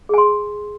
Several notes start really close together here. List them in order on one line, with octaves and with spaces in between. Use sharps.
G#4 G#5 C6